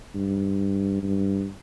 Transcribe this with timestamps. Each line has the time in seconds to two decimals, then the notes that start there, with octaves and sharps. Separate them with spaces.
0.15 G2
1.03 G2